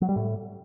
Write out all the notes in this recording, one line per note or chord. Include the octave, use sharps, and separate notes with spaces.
F#3
G3
A2